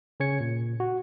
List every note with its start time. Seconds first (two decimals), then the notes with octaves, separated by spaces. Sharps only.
0.20 C#3 C#4 C#5 G#6 C#7
0.40 A#2
0.80 F#4